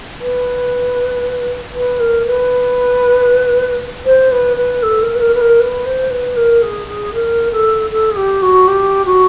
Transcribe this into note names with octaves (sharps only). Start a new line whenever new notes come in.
B4
B4
A#4
B4
C5
B4
B4
A4
A#4
B4
A#4
B4
A#4
B4
C5
B4
A#4
G#4
G#4
A#4
A4
A4
G#4
G4
F#4
G4
F#4